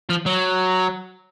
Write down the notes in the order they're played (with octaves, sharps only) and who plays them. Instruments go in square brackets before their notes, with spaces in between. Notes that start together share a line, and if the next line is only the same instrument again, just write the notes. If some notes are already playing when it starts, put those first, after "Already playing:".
[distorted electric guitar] F3
F#3